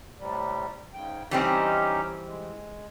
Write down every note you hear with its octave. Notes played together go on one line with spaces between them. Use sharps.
A2 C3 G3
G#2 C#3 G5
E3 G3 C4 C#4 D#4 G4
G#3